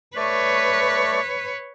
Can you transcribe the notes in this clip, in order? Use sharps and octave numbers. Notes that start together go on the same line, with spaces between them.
A3 B4 C#5 D5 C#6